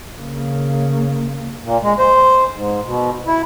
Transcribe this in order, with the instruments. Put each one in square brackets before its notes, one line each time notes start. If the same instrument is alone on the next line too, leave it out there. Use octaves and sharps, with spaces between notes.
[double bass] C#3 A#3
[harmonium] A#2
G#3
C5
G#2
B2
E4